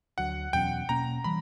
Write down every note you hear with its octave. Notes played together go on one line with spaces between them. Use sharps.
D2 D3 F#3 F#5
E2 B2 F#3 C#4 G5
B2 A#3 C#4 A#5
E3 G3 B5